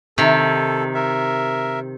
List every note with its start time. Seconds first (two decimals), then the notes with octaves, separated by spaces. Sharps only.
0.18 C3 D#3 A4
0.95 A#4 E5